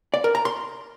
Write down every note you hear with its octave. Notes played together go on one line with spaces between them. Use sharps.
D5
A#4
A#5
C6